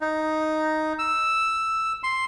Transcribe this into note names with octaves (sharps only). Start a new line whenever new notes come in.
D#4
E6
C6